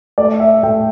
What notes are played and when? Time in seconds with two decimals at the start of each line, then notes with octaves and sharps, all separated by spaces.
0.18 A3 D5
0.40 E5
0.63 A3 G5